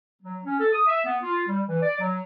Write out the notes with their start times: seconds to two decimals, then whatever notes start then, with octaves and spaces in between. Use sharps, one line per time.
0.22 F#3
0.44 C#4
0.59 A4
0.73 D#6
0.87 E5
1.05 B3
1.22 F4
1.48 G3
1.68 E3
1.82 D5
2.00 F#3